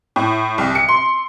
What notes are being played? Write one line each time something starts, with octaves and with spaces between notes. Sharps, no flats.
A2
C2
C#7
C6